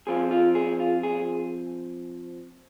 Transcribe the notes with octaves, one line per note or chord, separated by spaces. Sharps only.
F3 C4 F4 G#4
F4
G#4
F4
G#4